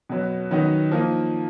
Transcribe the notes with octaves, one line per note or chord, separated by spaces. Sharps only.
B2 F#3 B3
D#3 F#3 B3 D#4
F3 A#3 D#4